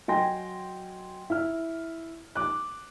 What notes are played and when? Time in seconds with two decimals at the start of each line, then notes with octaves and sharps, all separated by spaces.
0.08 F#3 D#5 G5 G#5 C6 A#6
1.30 E4 F6
2.35 D6 F#6